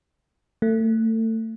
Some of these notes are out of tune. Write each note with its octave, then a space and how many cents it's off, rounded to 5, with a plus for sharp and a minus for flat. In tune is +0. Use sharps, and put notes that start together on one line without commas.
A3 +30